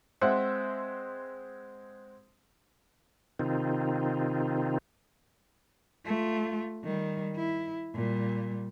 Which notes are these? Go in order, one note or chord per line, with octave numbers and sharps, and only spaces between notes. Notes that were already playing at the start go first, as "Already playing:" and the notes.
G#3 C4 C5 E5 F#5
C3 D#3 C4 D#4 F4
A3 F4
D#3 G3
E4
A#2 G3